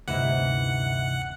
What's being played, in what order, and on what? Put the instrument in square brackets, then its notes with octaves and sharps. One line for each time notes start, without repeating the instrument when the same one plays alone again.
[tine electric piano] D2 G2 C3 [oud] E3 D#4 E4 [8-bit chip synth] F#5